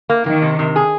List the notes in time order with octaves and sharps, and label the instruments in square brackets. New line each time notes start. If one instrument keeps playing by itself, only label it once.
[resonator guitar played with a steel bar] A#3
[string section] D#3 [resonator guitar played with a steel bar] A#3
[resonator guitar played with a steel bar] C3
C3
G#4